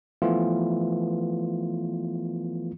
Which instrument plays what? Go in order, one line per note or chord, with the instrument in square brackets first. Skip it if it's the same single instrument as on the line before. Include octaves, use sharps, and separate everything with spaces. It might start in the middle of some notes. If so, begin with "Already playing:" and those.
[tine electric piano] E3 F3 A3 B3 F4